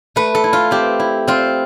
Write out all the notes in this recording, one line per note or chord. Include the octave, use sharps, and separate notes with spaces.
A3 B4
A4
E4
F4
C4 G4
E4
C4 F4